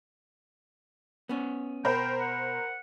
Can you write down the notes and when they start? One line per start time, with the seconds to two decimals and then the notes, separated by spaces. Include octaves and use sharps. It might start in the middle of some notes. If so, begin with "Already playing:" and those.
1.29 B3 C#4
1.85 B2 A#4 C5 G5 B5
2.20 F#5